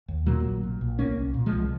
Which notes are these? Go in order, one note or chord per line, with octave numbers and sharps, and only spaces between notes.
D#2
A#2 F#3 A#3
A#1
A#2
A#1
C2 A#3 C#4
C2
A#2
F3 G#3
C2